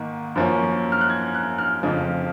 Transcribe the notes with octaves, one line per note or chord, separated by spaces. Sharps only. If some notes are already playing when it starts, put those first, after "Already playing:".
Already playing: G#2 D#3 A#3
F#2 F3 A#3 C#4
F6
F#6
G#6
F#6
F6
F2 C#3 F3